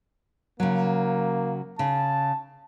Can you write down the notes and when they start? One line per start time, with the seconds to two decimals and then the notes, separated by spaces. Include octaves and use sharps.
0.60 C#3 F#3 A#3
1.79 C#3 A5